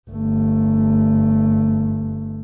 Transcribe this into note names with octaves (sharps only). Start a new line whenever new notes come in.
G1 A3